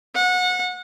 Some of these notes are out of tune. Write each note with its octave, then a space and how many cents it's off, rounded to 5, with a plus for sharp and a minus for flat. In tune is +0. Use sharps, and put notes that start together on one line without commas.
F#5 -25